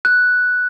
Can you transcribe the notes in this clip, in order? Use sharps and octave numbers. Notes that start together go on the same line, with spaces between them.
F#6